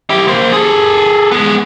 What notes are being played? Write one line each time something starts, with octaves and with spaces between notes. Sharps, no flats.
E4 G4
A#3 C5
G#4 A4
G#3 B3